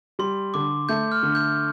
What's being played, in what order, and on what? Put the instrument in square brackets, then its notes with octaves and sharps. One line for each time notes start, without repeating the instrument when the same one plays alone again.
[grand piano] G3 [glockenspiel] C6
[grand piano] D3 [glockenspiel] D6
[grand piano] A3 [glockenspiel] G6
[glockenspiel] F6
[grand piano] D3
[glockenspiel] G6